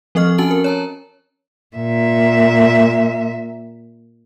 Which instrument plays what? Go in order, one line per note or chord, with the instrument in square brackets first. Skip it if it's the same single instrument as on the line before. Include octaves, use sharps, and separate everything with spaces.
[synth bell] F3 C4 A4 D#5 C#6 F6
C#4 F#4 G#5 A5 F#7
A#4
C#5 A5 A#5
[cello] A#2 E5